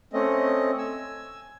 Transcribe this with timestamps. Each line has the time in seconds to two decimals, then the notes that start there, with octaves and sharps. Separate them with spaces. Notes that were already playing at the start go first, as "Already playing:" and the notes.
0.13 A3 C4 C#4 D#5
0.78 G#5 E6